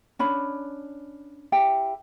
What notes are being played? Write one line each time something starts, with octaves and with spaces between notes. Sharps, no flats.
C#4 D4 B5
E4 G4 G5